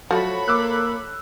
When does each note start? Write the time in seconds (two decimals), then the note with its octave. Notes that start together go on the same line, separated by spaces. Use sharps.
0.11 F3 F#3 A3 F#4 A4 C#5 B5
0.48 A#3 D6 E6 F#6